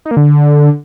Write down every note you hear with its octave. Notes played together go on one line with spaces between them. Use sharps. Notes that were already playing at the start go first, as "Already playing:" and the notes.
D#4
A#3
D3